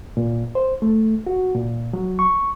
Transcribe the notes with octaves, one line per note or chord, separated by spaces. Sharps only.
A#2
C5
A3
F#4
A#2
F#3
C#6